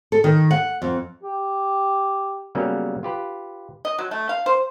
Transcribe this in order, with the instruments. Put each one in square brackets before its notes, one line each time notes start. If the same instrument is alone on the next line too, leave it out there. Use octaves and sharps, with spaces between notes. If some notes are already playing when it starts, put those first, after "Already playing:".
[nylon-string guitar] A4
D#3
F#5
F2
[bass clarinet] G4
[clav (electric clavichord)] C#3 F#3 G3 A#3 B3 C#4
F4 G4 B4
[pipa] D#5
F#3
A3
F5
C5